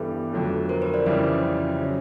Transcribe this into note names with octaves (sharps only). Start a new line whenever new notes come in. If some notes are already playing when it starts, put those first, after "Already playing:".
Already playing: G2 E3 G3 B3 A4 B4
F2 D3 F#3 A3
A#4 C5
B4 C#5
C5 D5
F2 C#3 E3 G3 C5 D5
C#3 F#3